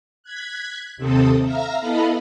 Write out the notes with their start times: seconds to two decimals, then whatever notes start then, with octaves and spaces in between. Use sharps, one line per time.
0.23 F#6 G#6 B6
0.97 D#2 C3 C4 A4 D#6
1.44 E5 F5 A#5 F6 A#6
1.81 B3 E4 A4 D#5 F5 B5